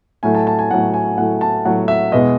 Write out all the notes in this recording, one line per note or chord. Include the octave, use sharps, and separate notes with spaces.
A2 F#3 A3 G#5
A5
A5
G#5
A2 F#3 A3 F#5
G#5
A2 F#3 A3 F#5
A5
A2 F#3 A3 F#5
E5
E2 B2 G#3 D#5